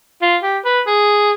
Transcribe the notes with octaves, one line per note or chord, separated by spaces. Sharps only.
F4
G4
B4
G#4